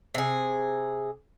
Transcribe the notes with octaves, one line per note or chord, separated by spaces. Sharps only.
C3 G#4